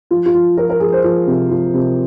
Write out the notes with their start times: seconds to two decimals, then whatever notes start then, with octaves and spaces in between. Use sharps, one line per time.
0.11 F3 F4
0.26 F4
0.34 F3
0.57 F3 A#4
0.70 A#4
0.80 F3 G#4
0.92 C5
1.04 F3
1.27 C3
1.50 F3
1.74 C3